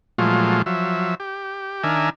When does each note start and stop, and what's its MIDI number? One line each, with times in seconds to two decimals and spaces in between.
0.18 0.62 46
0.18 0.62 53
0.18 0.62 54
0.18 0.62 56
0.18 0.62 57
0.18 0.62 65
0.66 1.15 53
0.66 1.15 54
0.66 1.15 76
1.20 1.83 67
1.83 2.10 51
1.83 2.10 62
1.83 2.10 70
1.83 2.10 76
1.83 2.10 80